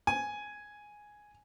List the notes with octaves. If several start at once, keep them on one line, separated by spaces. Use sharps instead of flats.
G#5